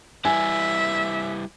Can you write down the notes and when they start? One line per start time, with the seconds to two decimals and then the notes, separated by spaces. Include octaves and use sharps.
0.25 G3 E4 B4 E5 G#5